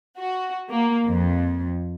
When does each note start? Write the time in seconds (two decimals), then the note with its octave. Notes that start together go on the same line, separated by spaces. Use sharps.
0.17 F#4
0.70 A#3
1.08 F2